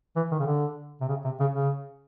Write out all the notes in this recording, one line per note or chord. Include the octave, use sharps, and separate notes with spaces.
E3
D#3
C#3
D3
C3
C#3
C3
C#3
C#3